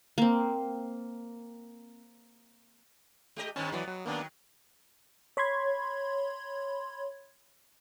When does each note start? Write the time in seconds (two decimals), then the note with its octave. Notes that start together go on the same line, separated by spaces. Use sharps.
0.18 A#3 C4
3.36 G#3 G4 D#5
3.56 G2 D#3 B3 C#4 A5
3.72 E3 F#3 B3 D5
3.88 F#3
4.05 D#3 F#3 A#3 B3 D4
5.37 C#5 B5 C6 G#6